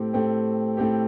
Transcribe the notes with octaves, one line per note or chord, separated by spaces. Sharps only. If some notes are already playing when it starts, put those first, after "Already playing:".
Already playing: A2 A3 C4 G4
A2 A3 C4 G4
A2 A3 C4 G4